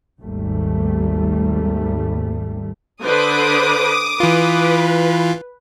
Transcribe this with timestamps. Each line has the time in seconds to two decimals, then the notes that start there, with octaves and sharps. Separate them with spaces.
0.21 G#1 D#2 G3 A3
3.05 D3 B4 C5 D6 D#6
4.20 E3 F4 B4